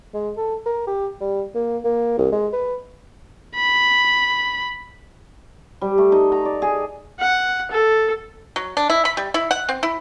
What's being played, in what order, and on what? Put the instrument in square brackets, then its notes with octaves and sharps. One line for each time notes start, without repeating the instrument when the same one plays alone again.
[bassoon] G#3
A4
A#4
G4
G3
A#3
A#3
C2
G#3
B4
[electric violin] B5
[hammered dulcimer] G3
A3
D#4
A#5
D5
G#4
[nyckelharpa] F#5
A4
[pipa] F#3
D4
E4
B5
G3
E4
F#5
C4
E4